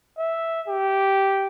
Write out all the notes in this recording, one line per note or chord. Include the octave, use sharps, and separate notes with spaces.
E5
G4